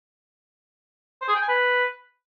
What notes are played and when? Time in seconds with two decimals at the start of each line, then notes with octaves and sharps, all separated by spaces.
1.22 C5
1.28 G#4
1.35 G5
1.42 G#5
1.48 B4